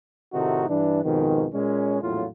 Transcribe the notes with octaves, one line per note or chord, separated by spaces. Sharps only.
A2 C3 D#3 A3 D#4 F#4
G2 E3 D4
F2 G#2 B2 D#3
A#2 G#3 C#4
A#1 E2 A2 F#3 F4